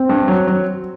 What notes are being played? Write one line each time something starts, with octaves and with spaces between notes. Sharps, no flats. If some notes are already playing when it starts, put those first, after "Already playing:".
Already playing: C4
G2
F#3
F#3